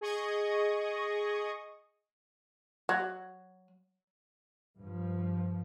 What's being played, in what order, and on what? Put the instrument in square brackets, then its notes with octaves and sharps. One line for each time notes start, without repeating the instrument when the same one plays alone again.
[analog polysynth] G#4 D#5 C#6 D#6
[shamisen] F#3
[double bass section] G2 F3